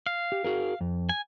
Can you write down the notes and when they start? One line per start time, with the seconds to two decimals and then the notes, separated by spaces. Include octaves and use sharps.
0.06 F5
0.32 G4
0.44 F#4 G#4 A#4
0.81 F2
1.09 G#5